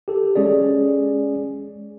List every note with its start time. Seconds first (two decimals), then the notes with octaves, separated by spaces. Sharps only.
0.08 G4 A4
0.36 G#3 C#4 G#4 D5